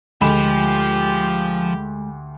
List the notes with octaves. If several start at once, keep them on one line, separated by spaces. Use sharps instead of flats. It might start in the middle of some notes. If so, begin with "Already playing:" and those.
D2 F3 G#3 F4 G4 B5 E7